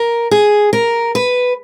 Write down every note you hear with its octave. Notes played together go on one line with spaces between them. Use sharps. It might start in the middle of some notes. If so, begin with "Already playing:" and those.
Already playing: A#4
G#4
A#4
B4